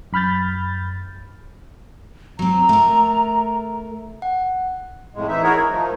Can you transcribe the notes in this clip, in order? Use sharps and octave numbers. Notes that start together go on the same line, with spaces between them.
F#2 B5 F6 G6 A6
F#3 C4 A#5
A3 A#4
F#5
F2 A2 G#3
E3 D#4 E5
D#4 E4 F#4 G#4 A#4 C#5
D2
D#3 F3 A3 D#4